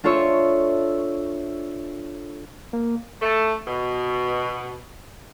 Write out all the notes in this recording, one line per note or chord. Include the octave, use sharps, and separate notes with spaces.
D4 F4 A4 C5 C#5 E5
A#3
A3
B2